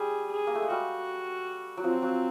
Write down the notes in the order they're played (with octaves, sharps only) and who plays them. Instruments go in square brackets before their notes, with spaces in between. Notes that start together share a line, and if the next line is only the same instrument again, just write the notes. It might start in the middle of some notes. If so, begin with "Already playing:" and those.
Already playing: [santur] G3 [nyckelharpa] G#4
[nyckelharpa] G#4
[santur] A#3
A3
G#3
[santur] G3 [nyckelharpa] F#4
[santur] F#3
[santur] F3 [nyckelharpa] C4
[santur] F#3